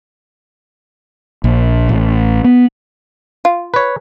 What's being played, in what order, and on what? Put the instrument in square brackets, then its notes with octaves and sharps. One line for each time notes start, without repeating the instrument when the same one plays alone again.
[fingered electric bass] A#1
A1
B3
[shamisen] F4
[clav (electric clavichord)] B4 C#5